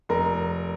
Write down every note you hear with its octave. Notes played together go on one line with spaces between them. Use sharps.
F1 A#4